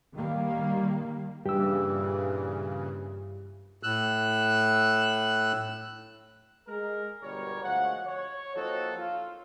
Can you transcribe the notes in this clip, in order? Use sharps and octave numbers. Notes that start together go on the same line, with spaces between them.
D#3 G3 A#3
G2 A#2 C#3 E3 G4 E6
A2 E6 F#6
G#3 A#4
G1 B2 G3 A#4 C#5
D2 F3 G#3 F#4 F#5
C#5
F3 A#3 C4 D#4 F#4 A4
F4